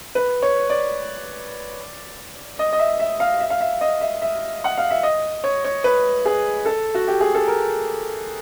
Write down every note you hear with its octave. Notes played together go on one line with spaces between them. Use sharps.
B4
C#5
D5
D#5
D#5
E5
E5
F5
E5
F5
E5
D#5
E5
E5
F#5
F5
E5
D#5
C#5
C#5
B4
G#4
A4
F#4
G4
G#4
A4
A#4